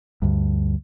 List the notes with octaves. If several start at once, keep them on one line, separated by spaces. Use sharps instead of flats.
D2 G2